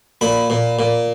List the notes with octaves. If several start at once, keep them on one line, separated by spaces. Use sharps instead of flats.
A#2 B5
A#2
A#2